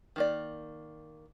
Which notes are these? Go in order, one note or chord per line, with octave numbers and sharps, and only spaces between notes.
D#3 A#3 D5